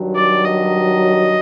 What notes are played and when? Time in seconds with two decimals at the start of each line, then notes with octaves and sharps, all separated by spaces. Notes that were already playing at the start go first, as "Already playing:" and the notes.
Already playing: G2 D#3 F#3
0.16 D5
0.45 D#5